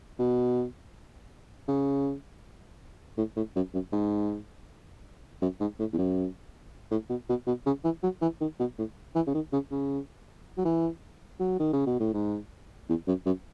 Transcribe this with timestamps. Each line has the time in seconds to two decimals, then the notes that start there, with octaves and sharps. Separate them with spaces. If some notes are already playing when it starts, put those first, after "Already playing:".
0.19 B2
1.68 C#3
3.17 A2
3.36 A2
3.56 F#2
3.74 F#2
3.92 G#2
5.42 F#2
5.61 G#2
5.79 A2
5.93 E2
5.98 F#2
6.91 A2
7.10 B2
7.29 B2
7.47 B2
7.66 C#3
7.84 E3
8.03 F#3
8.22 E3
8.41 D#3
8.59 B2
8.78 A2
9.15 E3
9.27 C#3
9.34 D#3
9.53 C#3
9.71 C#3
10.58 F#3
10.65 E3
11.40 F#3
11.59 D#3
11.73 C#3
11.86 B2
12.00 A2
12.14 G#2
12.89 E2
13.07 F#2
13.26 F#2